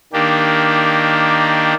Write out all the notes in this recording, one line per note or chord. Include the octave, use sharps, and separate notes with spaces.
D#3 A#3 D4 G4